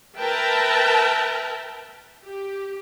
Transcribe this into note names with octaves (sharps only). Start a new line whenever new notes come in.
A#4 B4 E5 G5 A5
G4